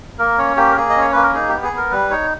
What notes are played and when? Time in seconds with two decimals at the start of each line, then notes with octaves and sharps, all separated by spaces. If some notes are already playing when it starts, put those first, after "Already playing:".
0.19 A#3 A#4
0.38 C#4 C#5
0.57 A#3 G4
0.71 A#4
0.76 A#3 G#4
0.90 D#5
0.96 C#4 C#5
1.12 A#3 B4
1.23 A#4
1.34 D#4 G#4
1.49 B3 G4
1.63 G#4
1.73 B3 A#4
1.91 G3 B4
2.11 D#4 C#5